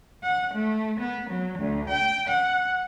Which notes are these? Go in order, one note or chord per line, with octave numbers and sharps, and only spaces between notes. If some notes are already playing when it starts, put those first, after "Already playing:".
F#5
A3
B3
F#3
D2
G5
F#5